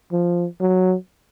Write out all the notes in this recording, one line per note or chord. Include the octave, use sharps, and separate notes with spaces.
F3
F#3